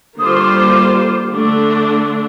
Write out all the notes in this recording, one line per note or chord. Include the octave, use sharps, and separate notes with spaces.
D3 G3 A#3 F4 C5 D#6
D6
C6
D6
D3 A3 D4